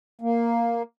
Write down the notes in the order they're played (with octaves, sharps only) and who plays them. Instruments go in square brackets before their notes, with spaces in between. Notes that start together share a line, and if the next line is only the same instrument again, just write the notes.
[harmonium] A#3